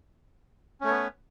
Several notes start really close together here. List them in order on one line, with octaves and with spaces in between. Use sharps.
C#4 A3 C#5 B3 B4